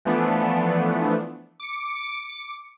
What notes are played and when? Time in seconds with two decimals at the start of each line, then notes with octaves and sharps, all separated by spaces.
0.05 E3 F3 A3 B3 D4
1.60 D6 C#7